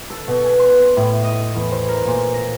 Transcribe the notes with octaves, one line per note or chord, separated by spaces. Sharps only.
A4
B2
G#5
C6
A2
D#5
E2
C5
A#4
A#2
A#6